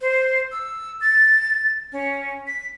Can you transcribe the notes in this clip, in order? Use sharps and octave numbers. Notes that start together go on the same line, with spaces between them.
C5
E6
A6
C#4
B6